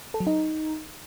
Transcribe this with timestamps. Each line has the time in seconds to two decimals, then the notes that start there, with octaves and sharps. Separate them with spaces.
0.14 A4
0.20 F#3
0.27 D#4